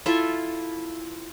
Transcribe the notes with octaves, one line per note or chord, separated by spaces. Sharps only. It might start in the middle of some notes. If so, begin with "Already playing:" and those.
E4 F4 A4 E5